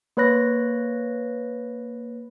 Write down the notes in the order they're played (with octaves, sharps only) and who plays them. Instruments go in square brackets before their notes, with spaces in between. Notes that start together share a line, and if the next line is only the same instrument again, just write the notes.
[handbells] A#3 B4 C#5 B5 F#6 A#6